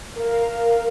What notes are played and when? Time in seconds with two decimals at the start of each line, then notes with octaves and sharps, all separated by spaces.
0.16 A#4 F5